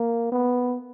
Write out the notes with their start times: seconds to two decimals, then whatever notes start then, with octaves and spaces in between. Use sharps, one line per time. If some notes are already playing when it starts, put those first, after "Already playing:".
Already playing: A#3
0.32 B3